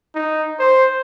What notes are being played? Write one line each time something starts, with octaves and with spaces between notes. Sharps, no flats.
D#4
C5